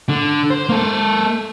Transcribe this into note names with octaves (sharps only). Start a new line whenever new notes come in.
D3
C5
A#3 A4